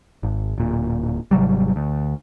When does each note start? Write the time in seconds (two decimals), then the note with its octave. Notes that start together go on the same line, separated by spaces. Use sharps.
0.23 G#1
0.58 D1 A#2
1.31 G#1 C3 F#3 G3
1.76 D2